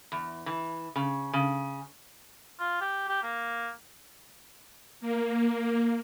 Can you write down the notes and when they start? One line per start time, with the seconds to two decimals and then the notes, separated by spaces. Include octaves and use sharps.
0.12 E2
0.46 E3
0.96 C#3
1.33 C#3
2.60 F4
2.81 G4
3.09 G4
3.23 A#3
5.01 A#3